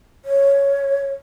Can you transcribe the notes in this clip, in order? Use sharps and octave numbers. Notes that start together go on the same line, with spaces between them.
C#5